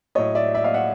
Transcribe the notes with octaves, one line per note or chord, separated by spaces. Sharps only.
A2 F#3 C#5 D#5
D5 E5
D5 E5
D#5 F5
E5 F#5